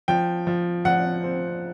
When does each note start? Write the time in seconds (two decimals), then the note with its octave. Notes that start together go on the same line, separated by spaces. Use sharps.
0.08 F3 G5
0.47 F3
0.85 F3 F#5
1.24 C4